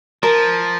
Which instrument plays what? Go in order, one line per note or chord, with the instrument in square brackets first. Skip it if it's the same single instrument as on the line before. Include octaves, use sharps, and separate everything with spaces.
[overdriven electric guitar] F3 [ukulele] A#4